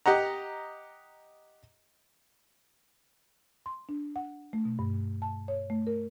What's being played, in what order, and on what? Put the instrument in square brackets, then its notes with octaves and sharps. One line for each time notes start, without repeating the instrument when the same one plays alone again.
[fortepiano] G4 D#5 F#5 A#5
[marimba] C6
D4
F#5
A3
B2
G2
A5
C#5
A3
A#4